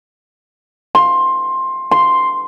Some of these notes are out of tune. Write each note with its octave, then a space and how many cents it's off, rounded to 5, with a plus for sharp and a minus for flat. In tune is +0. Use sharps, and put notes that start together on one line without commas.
C6 +15
C6 +0